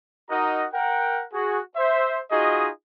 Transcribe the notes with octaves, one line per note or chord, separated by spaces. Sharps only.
D#4 F#4 A#4 D#5 F#5 A#5
A#4 F#5 G5
F#4 G#4
C5 E5
D#4 F4 F#4 G#4 D#5